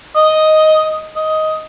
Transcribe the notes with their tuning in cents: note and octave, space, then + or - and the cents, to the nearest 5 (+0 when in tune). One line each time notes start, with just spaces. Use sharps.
D#5 +5
D#5 +10